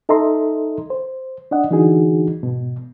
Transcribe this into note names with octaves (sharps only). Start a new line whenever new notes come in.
D#4 A4 D#5 E5 A#5 C6
C5
D4 D5 D#5 F#5
D3 E3 D4 D#4 F#4 G#4
G#2 B2